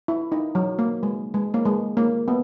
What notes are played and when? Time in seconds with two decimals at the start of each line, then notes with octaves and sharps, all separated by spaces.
0.08 E4
0.32 D#4
0.55 F#3
0.79 A#3
1.03 G#3
1.34 G#3
1.54 A#3
1.65 G#3
1.97 A#3
2.28 B3